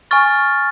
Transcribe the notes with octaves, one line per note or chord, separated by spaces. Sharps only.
G#5 C#6 F6 A6